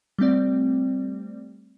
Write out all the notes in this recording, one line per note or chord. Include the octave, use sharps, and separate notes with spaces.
G3 A3 C4 D5